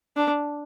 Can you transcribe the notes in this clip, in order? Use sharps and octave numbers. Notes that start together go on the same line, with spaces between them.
D4